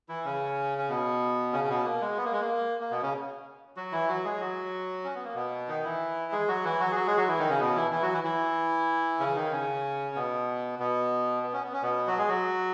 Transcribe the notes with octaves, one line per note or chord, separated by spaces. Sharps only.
E3 E4
C#3 C#4
C#4
B2 B3
C#3 C#4
C#4
B2 B3
A#3
G#3
B3
A#3
G#3
A#3
A#3
B2 B3
C#3 C#4
F#3 F#4
E3 E4
F#3 F#4
G#3 G#4
F#3 F#4
C#4
B3
A#3
B2 B3
D#3 D#4
E3 E4
G#3 G#4
F#3 F#4
E3 E4
F#3 F#4
G#4
F#3 F#4
G#3 G#4
F#3 F#4
E3 E4
D#3 D#4
C#3 C#4
B2 B3
E3 E4
E3 E4
F#3 F#4
E3 E4
E3 E4
C#3 C#4
D#3 D#4
C#3 C#4
B2 B3
B2 B3
B3
C#4
B3
C#4
B2 B3
F#3 F#4
G#3 G#4
F#3 F#4